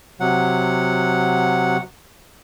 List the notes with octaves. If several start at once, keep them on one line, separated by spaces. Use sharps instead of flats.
C3 F#3 F#5